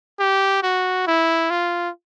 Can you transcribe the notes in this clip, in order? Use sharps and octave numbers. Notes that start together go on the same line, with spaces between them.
G4
F#4
E4
F4